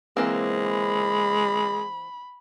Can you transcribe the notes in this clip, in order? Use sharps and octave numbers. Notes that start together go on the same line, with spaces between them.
E3 G#3 A#3 C4
B5